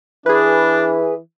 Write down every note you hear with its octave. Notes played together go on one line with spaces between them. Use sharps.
E3 D4 G#4 B4